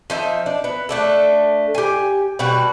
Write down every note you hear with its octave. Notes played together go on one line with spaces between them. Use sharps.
F3 D#4 E5
D4
B3
A3 D4 A4
G4 G#5
B2 G3 F#4